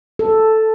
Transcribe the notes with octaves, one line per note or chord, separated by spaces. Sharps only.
A4